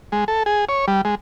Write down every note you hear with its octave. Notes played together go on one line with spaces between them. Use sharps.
G#3
A4
G#4
C#5
G3
G#3